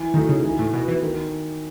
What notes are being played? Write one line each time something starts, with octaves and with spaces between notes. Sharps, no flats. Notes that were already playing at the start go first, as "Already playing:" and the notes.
Already playing: E3
D#3 A3 D#4 F#4
C#3
E3
A2
B2 B3 F#4
E3
D#3